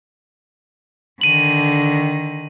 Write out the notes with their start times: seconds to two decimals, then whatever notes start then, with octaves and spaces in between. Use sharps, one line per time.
1.21 D3 D#3 D#7 F#7